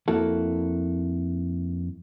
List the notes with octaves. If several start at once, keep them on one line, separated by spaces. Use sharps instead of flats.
F2 A#3 E4 F#4 A4